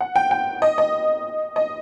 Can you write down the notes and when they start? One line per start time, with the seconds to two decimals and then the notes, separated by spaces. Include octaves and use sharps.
0.01 F#5
0.16 G5
0.31 G5
0.62 D#5
0.78 D#5
1.56 D#5